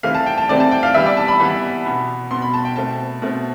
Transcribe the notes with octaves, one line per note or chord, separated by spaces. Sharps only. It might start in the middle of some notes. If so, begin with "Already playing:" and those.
C3 E3 A3 C4 F5
A5
G5
A5
C3 E3 A3 C4 D5
A5
G5
F5
E3 G3 B3 E5
D5
A5
B5
E3 G3 B3
B2 B3
B2 B3 C6
B5
A5
G5
B2 A3 C4 A5
B2 A3 C4